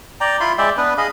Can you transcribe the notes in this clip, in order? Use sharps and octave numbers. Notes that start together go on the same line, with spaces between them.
D5 G5 A#5
E4 F4 B5 C6
G#3 D5 E5 G5
B3 D4 B4
G#4 D#5 F5 B5